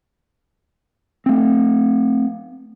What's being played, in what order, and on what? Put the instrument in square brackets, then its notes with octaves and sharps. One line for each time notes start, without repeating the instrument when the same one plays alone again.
[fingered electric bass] A3 C4